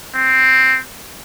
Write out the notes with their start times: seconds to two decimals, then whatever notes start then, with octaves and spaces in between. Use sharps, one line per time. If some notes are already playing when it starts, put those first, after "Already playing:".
0.15 C4